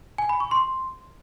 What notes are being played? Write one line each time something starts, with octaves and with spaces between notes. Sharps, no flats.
G#5
B5
C#6
C6